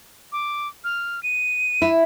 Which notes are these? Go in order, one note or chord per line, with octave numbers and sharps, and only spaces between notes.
D6
F6
D#7
E4